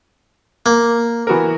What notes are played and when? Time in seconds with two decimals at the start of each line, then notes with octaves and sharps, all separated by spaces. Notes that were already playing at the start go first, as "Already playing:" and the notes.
0.66 A#3
1.27 E3 B3 F#4 A#4